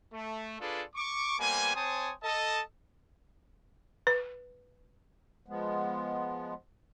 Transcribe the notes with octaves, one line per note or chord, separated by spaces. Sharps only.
A3
D4 F4 G#4 A4 B4 D5
C#6 D6
G3 A#3 B3 C5 G#5
C4 C5 C#5 G#5 A5 D#6
A4 D#5 A5
B4
F3 G#3 B3